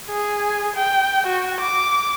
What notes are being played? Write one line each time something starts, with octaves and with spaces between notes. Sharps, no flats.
G#4
G5
F#4
D6